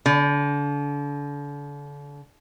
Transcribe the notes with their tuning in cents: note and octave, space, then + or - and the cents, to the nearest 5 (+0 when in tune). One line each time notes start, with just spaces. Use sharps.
D3 -35